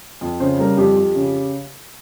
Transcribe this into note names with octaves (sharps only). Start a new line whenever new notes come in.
F2
C#3 C5
G3 A#4
F2 G4
F2
C#3